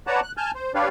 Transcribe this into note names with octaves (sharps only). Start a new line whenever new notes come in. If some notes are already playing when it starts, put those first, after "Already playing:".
B4 C#5 D5 F#5 A5 A#5
F#6
G#5 A5 F6 G6
C5
D4 G4 B4 C#5 D5 F5